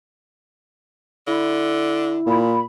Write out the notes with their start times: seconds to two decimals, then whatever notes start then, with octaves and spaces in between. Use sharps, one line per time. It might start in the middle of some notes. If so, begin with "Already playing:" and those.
1.27 D3 E4
2.27 A#2 B5